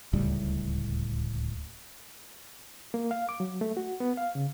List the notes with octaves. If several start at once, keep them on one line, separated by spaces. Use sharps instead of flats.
D1 C#2 A2 G3
A#3
F5
D6
F#3
A3
F#4
B3
F5
C#3